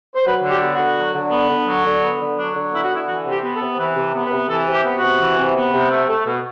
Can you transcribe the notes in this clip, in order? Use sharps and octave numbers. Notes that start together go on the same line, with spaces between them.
C5
F#3 B4
D3
G4
B3
F#4
D3
F#3
D3
B3
D3
F#3
D3
B3
D3
F#3 D4
D3
B3 E4
F#4
D3 E4
E3 F#4
C3
G4
B3
A4
C3
E3 B4
C3
B3
B4
C3
E3 A4
C3
G4
B3
F#4
C3
E3
C3
B3
C3
A3
A3
B2